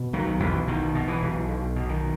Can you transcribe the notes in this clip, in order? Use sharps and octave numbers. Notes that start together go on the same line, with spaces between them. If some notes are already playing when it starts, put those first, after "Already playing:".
Already playing: B2
B1 D#3 F#3
B1 E3
B2 D#3
B2
E3
B1
B1
B2
D#3